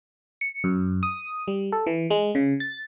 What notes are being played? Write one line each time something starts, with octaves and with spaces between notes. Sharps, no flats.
C#7
F#2
D#6
G3
A4
E3
G#3
C#3
A6